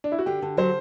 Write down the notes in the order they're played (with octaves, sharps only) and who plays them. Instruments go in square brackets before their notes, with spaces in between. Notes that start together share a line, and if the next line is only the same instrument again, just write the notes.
[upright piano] D4
E4
F#4
[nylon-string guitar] D3 [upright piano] G4
[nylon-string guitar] D3
[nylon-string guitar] F#3 [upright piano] C5